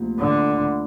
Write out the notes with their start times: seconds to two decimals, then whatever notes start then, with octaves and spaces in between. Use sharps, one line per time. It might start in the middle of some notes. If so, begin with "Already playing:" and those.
Already playing: D2 C3 F3 A#3
0.20 D3